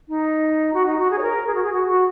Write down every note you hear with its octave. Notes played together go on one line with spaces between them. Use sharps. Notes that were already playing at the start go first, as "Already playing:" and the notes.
D#4
F#4
D#4
F#4
G#4
C#5
A#4
G#4
F#4
G#4
F#4
F#4